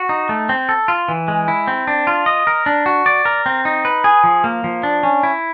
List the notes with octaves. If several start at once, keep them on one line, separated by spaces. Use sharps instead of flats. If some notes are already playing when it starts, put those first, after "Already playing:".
Already playing: F#4
D#4
A3
C4
A4
F4
E3
G#3
E4
C4
D4
F4
D#5
A#4
D4
F#4
D5
A#4
C4
D#4
B4
G#4
F3
A#3
F3
D4
C#4
E4